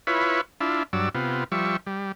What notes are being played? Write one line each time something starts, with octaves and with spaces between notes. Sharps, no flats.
E4 F4 B4 C#5
D4 E4 F4
G2 F#3 D5 E6
C3 B3 F4
F3 G3 E5 C#6
G3